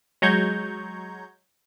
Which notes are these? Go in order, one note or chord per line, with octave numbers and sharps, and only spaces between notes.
F#3 G#3 A#5 C#6 G6 G#6